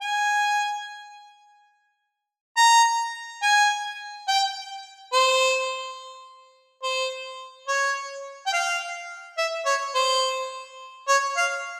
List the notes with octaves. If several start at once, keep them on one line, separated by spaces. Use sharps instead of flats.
G#5
A#5
G#5
G5
C5
C5
C#5
G5
F5
E5
C#5
C5
C#5
F5